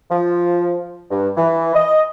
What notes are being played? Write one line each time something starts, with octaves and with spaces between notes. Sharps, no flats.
F3
G2
E3
D#5